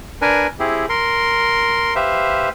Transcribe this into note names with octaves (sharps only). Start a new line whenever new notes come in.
D4 A#4 B4 G#5
C4 E4 G4 G#4
A#4 C6
G4 B4 C5 E5 F5